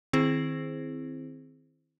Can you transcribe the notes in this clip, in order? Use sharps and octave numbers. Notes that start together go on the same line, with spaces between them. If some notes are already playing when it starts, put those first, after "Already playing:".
D#3 C4 E4 G#4 C5